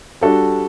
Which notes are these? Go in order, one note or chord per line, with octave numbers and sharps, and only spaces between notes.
G3 D4 F#4 A4